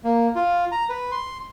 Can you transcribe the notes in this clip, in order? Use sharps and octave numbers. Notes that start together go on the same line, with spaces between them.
A#3
F4
A#5
B4
C6